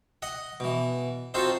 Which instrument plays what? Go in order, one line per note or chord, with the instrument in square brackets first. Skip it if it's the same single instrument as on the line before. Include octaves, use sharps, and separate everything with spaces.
[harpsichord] D#5 F#5
B2 E3
C4 D#4 F4 F#4 A4 C5